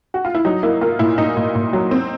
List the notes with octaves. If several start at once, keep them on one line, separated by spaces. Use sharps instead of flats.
F#4
F4
E4
F#3 D#4
A#3 E4
A#3 F4
A#2 E4
A#2 D#4
A#2
A#2
F#3
C4